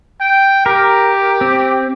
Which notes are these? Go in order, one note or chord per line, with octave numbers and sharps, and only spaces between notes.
G5
G4 A#4
C4